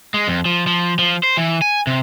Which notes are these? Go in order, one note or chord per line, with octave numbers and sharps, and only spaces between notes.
G#3
F2
F3
F3
F3
C5
E3
G#5
C3